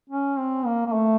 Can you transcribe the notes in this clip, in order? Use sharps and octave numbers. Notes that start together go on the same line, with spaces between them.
C#4
C4
A#3
A#3
A3